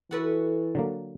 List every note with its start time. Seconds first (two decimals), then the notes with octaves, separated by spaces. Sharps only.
0.11 E3 F#4 A4 B4
0.75 D3 F#3 A#3